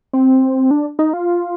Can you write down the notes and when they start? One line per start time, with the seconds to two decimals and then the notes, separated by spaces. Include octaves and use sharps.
0.13 C4
0.71 D4
0.99 D#4
1.13 F4